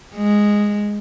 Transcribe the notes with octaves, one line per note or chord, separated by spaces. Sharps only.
G#3